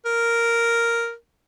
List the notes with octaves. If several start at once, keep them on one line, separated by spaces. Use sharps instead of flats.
A#4